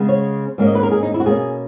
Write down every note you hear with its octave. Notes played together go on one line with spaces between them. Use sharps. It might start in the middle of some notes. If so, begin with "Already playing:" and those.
Already playing: C#3 G#3 B3
C#5
G#2 D#3 A#3 C#4
D#5
B4
A#4
G#4
D#4
E4
F#4
B2 A#3 C#4 G#4